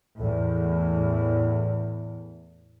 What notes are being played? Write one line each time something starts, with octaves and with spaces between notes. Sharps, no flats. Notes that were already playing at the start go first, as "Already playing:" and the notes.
E2 A2